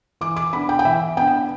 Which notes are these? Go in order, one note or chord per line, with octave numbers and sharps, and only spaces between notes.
E3 D6
D6
B3 D4 B5
G5
G5
E3 E5
B3 D4 G5